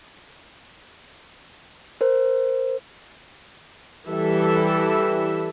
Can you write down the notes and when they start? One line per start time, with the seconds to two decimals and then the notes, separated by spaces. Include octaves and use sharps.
2.01 A#4 C5
4.08 E3 G3 A4 E5